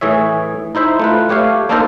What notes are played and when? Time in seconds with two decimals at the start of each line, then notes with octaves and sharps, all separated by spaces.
0.01 A2 E3 G#4 C#5 E5
0.75 D#4 E4 C5 E5
1.00 A3 F4 B4
1.29 A3 G4 C#5 F5
1.69 A#3 D4 D#4 A4 A#4 C5